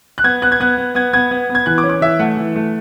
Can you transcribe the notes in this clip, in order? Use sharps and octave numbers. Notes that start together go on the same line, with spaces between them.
F#6
B3 G#6
B3 F#6
G#6
B3 F#6
B3
B3 G#6
B3 G#6
B3
B3
G#6
E3 F#6
D6
C#4
D6
E3 E5
A3 F#5
E3
A3